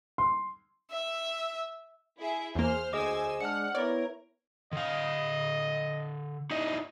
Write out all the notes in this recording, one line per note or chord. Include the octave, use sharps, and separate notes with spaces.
C6
E5
E4 G#4 E5
E2 A#3 G#4 C5 F6
D2 G#4 C5 D#5 G#5 D6 E6
G#3 D4 F#5 F6 C#7
B3 E4 A#4 C#5 D5
D3 D#5 F5
D#4 E4 D5 D#5